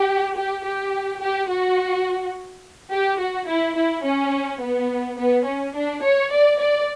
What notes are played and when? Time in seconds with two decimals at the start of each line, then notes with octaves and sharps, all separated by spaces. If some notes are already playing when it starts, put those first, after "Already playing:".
Already playing: G4
0.37 G4
0.66 G4
1.22 G4
1.50 F#4
2.92 G4
3.20 F#4
3.48 E4
3.77 E4
4.05 C#4
4.62 B3
5.18 B3
5.46 C#4
5.75 D4
6.04 C#5
6.32 D5
6.60 D5